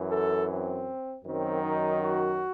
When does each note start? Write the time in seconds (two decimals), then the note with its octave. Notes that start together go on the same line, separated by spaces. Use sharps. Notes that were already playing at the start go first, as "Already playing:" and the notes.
Already playing: F#2 E3
0.10 A4
0.48 C4
1.24 F#2 D#3 F#3 C4
1.63 D#4
2.01 F#4